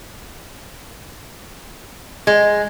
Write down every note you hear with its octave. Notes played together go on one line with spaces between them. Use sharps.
G#3